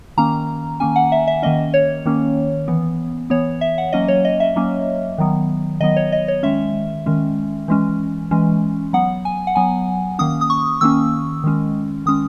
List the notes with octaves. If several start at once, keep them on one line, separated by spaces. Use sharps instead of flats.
D#3 A#3 C#4 A#5
D#3 A#3 C#4 G#5
F#5
E5
E5
D#3 A#3 C#4 D#5
C#5
D#3 A#3 C#4
E3 B3
E3 B3 C#5
E5
F#5
F#3 A#3 C#4 D#5
C#5
D#5
E5
F#3 A#3 C#4
D#3 F#3 B3
D#3 F#3 B3 D#5
C#5
D#5
C#5
D#3 G#3 C#4 E5
D#3 G#3 C#4
E3 G#3 C#4
E3 G#3 C#4
F#3 B3 F#5
G#5
F#5
F#3 B3 G#5
D#3 A#3 C#4 D#6
D#6
C#6
D#3 A#3 C#4 E6
D#3 G#3 C#4
D#3 G#3 C#4 D#6